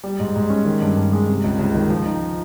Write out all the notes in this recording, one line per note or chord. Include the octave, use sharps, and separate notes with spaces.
G3
G#2
G#2
C#4
D#3
G2
G2
G#3
C3
C#2
C#2
D#3
F3
D#4